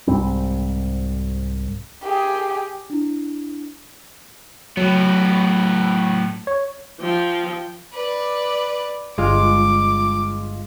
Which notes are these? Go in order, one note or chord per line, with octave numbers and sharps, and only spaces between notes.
C2 G#2 G3 C4
G4 G#4
D4 E4
A2 F#3 B3
C#5
F3 G5
B4 D5
G1 G#3 F4 D6